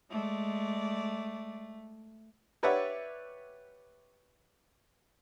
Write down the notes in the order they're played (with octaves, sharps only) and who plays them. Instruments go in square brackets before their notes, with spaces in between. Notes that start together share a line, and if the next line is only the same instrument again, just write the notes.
[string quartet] G#3 D5 [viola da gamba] A3
[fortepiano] G4 B4 C#5 D5 E5 F#5